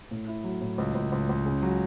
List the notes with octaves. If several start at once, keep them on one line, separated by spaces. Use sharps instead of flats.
A2
E4
F#3
A2
C#2
C#2
C#2
C#2
C#3
F#3